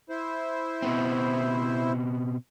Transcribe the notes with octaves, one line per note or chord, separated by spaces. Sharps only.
E4 C5
B2 B3 C4